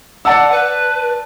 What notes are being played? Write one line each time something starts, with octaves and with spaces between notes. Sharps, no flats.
D5 F#5 A5 E6
B4